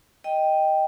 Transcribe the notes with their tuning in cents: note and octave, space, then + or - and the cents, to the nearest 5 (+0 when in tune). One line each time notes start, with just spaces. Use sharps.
D#5 +0 G5 +0